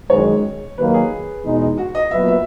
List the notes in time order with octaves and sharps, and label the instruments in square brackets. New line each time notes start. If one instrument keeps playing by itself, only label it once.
[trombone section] F#2 D#3 G#3 [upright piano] C#5
[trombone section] D#2 D#3 F#3 A#3 [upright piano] B4
[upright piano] G#4
[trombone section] E2 B2 G#3 D#4
[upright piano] F#4
D#5
[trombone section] A#2 F#3 B3 F#4 B4 [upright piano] E5
[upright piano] E5